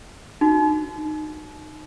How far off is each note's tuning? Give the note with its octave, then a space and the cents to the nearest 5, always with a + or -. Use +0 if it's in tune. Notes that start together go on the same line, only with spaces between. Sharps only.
D#4 -20 F#4 -10